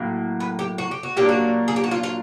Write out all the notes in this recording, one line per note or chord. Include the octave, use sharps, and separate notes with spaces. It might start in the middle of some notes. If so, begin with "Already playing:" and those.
Already playing: A2 F#3 A#3
B4
G4
F#4
G4
F#4
A#2 F#3 A#3 D4 G4
F#4
G#4
G4
F#4
F4
F4